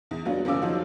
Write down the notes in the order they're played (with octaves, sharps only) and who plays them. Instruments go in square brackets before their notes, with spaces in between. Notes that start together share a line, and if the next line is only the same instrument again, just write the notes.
[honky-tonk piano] E2
F#3 B3 D4 F4 F#4
F#1 E2 C#4 F4 D6 E6
D#3 F3 F#3 C4 D#4 F4